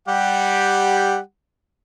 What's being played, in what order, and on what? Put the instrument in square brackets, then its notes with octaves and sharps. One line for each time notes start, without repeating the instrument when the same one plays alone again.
[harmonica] G3 G4 F#5